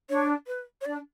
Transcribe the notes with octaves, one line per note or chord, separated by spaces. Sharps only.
D4 C#5
B4
C#5
D4 D5